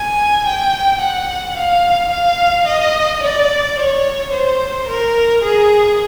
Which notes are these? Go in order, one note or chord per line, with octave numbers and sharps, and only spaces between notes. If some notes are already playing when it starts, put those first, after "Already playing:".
Already playing: G#5
G5
F#5
F5
F5
D#5
D5
C#5
C5
A#4
G#4